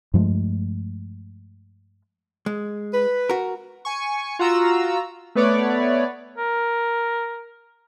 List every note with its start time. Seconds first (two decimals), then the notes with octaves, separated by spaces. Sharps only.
0.14 G2 F3 G#3 A3
2.46 G#3
2.93 B4
3.30 F#4 A#4
3.85 G#5 C#6
4.39 F4 F#4 A#5 E6
5.35 A3 B3 B4 C#5 D5
6.38 A#4